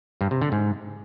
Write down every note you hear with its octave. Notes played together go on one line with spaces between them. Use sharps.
G2
C3
D3
G#2